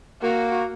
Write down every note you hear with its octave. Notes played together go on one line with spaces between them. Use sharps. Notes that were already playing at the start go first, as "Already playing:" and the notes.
A#3 F#4